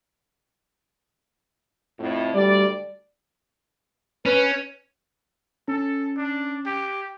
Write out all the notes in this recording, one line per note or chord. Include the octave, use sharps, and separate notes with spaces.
F2 A2
D2 G3 A3 D5
C#4 B4
C#4 A4
D4
G4